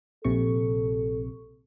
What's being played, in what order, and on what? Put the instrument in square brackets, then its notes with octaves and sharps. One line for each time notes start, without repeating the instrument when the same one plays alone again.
[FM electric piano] A#1 C3 C#6 [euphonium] A4